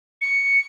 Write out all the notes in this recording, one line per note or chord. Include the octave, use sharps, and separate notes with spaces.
C#7